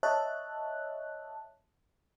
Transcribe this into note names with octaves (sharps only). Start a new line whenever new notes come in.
C#5 D#5 E5 A5 F#6